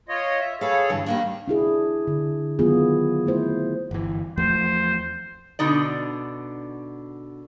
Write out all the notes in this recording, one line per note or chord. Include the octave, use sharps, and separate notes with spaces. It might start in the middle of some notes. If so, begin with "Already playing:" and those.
F4 C#5 D#5
E5
G#4 A4 B4 C#5 F5
G2 D3 E3
D#3 G3 A#3 D4
D4 E4 G#4
D3
D#3 F#3 B3 F4 G#4
A3 E4 C5
G1 E3
E2 F3 A3 C5
B2 D3 D#4 D5